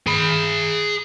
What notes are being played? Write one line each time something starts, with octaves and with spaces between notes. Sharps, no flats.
G#4 B5